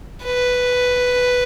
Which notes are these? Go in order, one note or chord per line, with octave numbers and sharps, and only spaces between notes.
B4